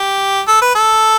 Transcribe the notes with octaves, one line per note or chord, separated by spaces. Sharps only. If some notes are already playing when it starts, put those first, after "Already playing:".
Already playing: G4
A4
B4
A4